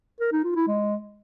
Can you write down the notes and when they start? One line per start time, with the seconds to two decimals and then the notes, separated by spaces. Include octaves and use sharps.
0.20 A#4
0.32 D#4
0.44 F4
0.56 E4
0.68 G#3